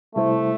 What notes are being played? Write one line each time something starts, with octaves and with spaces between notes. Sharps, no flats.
C3 G3 A3 E4 C5